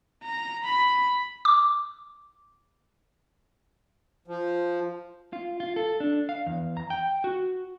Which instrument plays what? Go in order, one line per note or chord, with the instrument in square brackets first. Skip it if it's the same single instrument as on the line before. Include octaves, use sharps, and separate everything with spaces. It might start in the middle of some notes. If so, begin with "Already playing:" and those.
[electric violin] A#5
B5
[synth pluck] D6
[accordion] F3
[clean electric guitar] F4
F4
A4
D4
F5
E2
A#5
G5
F#4